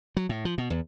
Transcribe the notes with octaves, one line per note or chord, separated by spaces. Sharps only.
F#3
A2
F3
B2
E2